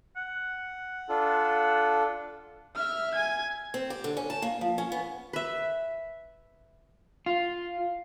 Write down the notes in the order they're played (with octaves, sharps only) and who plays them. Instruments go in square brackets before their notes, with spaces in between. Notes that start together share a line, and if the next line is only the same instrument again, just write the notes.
[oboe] F#5
[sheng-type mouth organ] D4 F4 A4
[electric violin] E5 F6
G#5 G#6
[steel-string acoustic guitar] C4
G4
D3
C#4
A5
A#3
F3
C#4
B3
[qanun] B4 E5
[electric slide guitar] F4